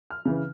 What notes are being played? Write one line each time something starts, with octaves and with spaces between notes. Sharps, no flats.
F6
C#3 E3